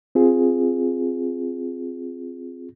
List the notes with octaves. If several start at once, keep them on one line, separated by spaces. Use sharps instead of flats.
C4 F4 G#4